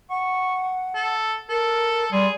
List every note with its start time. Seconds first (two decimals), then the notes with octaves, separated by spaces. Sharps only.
0.10 F#5 C#6
0.95 A4
1.50 A4 A#4
2.12 G3 G#4 C6